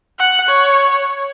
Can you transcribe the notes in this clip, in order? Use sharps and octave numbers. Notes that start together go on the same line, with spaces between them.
F#5
C#5